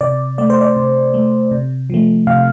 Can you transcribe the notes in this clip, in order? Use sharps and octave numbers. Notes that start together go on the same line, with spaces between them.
C3 D5
A3 D5
C5
D5
C3
A3
C3
F3 A3
C3 F5